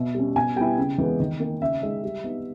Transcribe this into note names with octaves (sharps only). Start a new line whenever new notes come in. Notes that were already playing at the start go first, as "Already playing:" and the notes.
Already playing: B2 E5
G3 C#4
B2 G#5
G3 B3 E4 G5
C#3
E3 G#3 B3
D#3
A#3 D#4
C#3 E5
G#3 D#4
G3
B3 D#4